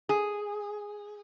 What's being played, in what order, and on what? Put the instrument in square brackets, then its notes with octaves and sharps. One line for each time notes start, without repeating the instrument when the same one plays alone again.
[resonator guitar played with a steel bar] G#4